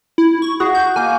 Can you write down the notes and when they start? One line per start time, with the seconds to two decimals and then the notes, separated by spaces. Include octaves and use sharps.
0.18 E4
0.42 C#6
0.60 F#4 G#4
0.75 G6
0.96 A#3 G#5